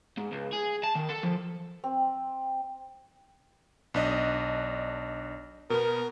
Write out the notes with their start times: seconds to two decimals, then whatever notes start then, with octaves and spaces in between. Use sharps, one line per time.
0.18 G#2
0.32 C#2
0.53 G#4
0.84 A5
0.95 D#3
1.09 A4
1.23 F3
1.84 C4
3.94 B1 D4 D#5
5.70 B2 B3 A#4